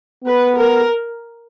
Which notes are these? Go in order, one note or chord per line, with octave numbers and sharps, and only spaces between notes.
B3 B4
A#4